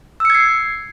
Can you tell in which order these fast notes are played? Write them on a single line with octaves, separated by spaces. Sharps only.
E6 C#7 G#6 C7